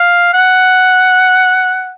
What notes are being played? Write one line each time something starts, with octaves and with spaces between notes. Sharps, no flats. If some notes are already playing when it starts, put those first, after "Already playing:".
Already playing: F5
F#5